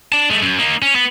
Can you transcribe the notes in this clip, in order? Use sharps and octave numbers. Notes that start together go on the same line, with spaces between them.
D4 A5
G#3 A3
F#2
A#3 D#4
C#4
B3